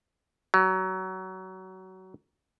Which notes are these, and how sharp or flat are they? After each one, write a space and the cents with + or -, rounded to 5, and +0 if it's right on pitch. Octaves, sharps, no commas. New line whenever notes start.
F#3 +25